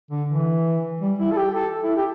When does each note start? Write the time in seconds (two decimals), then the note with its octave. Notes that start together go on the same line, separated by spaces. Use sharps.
0.11 D3
0.29 E3
1.01 G3
1.19 E4
1.32 A4
1.37 G4
1.55 A4
1.84 E4
1.96 G4